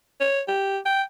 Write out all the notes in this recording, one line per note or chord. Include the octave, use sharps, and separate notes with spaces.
C#5
G4
G5